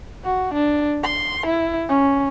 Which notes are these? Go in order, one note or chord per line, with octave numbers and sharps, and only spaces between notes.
F#4
D4
C6
E4
C#4